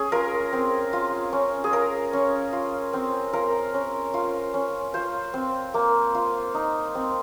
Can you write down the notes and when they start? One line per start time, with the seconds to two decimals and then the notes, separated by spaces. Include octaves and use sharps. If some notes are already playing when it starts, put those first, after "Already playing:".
Already playing: C#4 G#4
0.12 F4 A#4
0.53 C4
0.93 F4
1.33 C#4
1.64 G#4
1.73 F4 A#4
2.13 C#4
2.53 F4
2.93 C4
3.33 F4 A#4
3.74 C#4
4.14 F4
4.54 C#4
4.94 F4 C5
5.34 C4
5.74 A#3
6.15 F4
6.54 D#4
6.95 C4